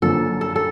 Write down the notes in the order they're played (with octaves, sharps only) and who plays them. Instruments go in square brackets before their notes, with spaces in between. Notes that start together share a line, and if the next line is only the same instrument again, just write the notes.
[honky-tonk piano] F#2 D3 F3 A#3 [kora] A4
[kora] A4
A4